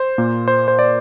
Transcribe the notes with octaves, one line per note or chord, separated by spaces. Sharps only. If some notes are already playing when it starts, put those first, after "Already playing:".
Already playing: C5
A#2 A#3
C5
C5
D5